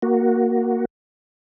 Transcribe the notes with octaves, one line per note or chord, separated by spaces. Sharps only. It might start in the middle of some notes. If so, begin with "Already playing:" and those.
A#3 F#4